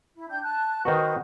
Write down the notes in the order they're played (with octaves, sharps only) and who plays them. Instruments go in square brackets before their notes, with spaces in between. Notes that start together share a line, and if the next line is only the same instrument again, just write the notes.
[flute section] E4
D4 G5 G6
A5 F#6
[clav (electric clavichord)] D#3 D#4 F#4 [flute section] B4 C5 F#5